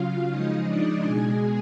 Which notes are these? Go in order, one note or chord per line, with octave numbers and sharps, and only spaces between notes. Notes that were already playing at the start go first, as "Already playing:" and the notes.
Already playing: C#3 F#3 F4 F5
C#3 F3 G#3 D#4 D#5
D4 D5
B2 G#3 G#4 G#5